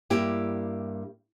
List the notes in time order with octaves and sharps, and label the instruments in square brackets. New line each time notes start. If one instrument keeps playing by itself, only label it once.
[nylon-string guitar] G2 A#3 E4 G4